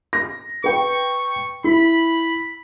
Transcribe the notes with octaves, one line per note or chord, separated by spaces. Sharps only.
A#6
B4 G5 C#6
E4 B5